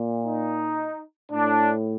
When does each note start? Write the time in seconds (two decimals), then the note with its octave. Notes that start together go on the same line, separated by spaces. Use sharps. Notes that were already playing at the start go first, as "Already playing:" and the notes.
Already playing: A#2
0.25 D#4
1.32 A2 D4